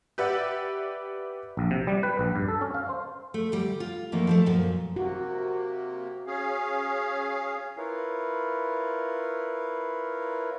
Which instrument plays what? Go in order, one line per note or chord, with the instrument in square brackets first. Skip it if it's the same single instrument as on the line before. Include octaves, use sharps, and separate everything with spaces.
[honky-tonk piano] G4 B4 D5 E5 F#5
[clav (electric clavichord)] A#1
C3
G3
B4
A#1
G2
A4
C#4
F5
C5
[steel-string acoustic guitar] A3
D2 G3
F4
F#2 E3 F3 A3 A#3 D#4
F3 G3 A3
F#2 A#2 F3
[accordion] C3 A#3 [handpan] F#4
[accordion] C#4 G#4 F5
E4 F4 A#4 B4 C#5 F5